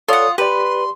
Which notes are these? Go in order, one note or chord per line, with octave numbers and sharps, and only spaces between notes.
F4 A4 C#5 D5 F#5 D#6
G4 B4 D5 C6